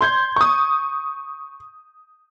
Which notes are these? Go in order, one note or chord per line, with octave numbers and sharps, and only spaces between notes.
C6 G6 G#6
C#6 D#6